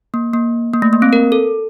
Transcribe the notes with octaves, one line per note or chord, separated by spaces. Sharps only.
A#3
A#3
A#3
A3
A#3
C4
A#4
A4